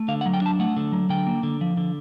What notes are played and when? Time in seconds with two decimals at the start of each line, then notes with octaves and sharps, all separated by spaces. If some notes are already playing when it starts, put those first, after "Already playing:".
Already playing: A3
0.08 D3 F5
0.21 F#5
0.26 F#3
0.34 G5
0.42 D4 A5
0.59 A3 F#5
0.77 D3
0.92 F#3
1.09 D3 G5
1.27 A#3
1.43 D3
1.61 F3
1.77 D3